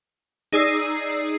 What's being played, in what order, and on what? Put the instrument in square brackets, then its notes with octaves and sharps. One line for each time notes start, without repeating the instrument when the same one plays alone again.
[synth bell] D#4 G#4 D5 D#6 E6 C7